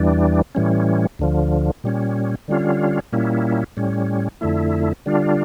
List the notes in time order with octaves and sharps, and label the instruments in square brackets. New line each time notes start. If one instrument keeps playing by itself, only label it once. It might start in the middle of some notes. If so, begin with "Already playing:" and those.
Already playing: [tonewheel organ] E2 E3 G3 D4
A2 E3 G3 C#4
D2 D3 F3
A#2 G3 C#4
D3 G3 C#4 F4
A#2 G3 A#3 C#4 E4
A2 G3 C#4
F2 D3 A3 E4
D3 G3 D4 F4